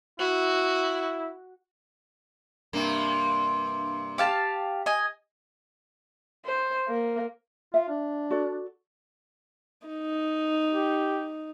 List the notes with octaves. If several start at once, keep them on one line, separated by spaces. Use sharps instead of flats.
E4 F#4
G2 C3 A#3
G4 F5 A5
D#5 G#5
C5
A#3
F4 E5
D4
F#4 A4 D5
D#4
G4